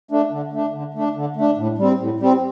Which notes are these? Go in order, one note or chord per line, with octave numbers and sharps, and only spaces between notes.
A3 D4
D3
A3 D4
D3
A3 D4
D3
A3 D4
A2
G3 C4
A2
G3 C4